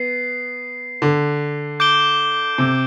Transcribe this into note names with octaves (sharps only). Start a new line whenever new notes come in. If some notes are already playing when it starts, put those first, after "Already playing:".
Already playing: B3 C7
D3
D6 G6 D7 G7
C3